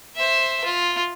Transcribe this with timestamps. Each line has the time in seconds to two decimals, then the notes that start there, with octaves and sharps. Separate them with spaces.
0.16 C5 E5
0.65 F4